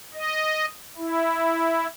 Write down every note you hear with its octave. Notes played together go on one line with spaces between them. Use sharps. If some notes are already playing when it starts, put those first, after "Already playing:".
D#5
E4